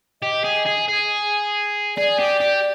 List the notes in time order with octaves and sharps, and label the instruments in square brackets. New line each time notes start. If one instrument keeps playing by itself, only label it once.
[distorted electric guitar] G4 [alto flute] D#5
[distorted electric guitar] G#4
G#4
G#4
[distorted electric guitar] G#4 [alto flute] D5
[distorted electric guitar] G4
G4